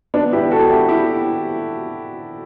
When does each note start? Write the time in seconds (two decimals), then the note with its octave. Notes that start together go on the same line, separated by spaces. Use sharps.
0.14 B3 D4
0.33 E4 G4
0.51 F#4 A4
0.70 E4 G4
0.88 E4 G4